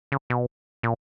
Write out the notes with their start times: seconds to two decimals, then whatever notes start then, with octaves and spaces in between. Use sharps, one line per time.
0.12 C#3
0.30 B2
0.83 A#2